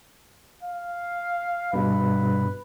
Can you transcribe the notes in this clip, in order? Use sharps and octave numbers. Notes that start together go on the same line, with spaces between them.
F5
G2 B2 B4